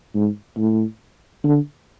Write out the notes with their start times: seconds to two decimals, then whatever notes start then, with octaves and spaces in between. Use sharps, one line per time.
0.14 G#2
0.57 A2
1.44 D3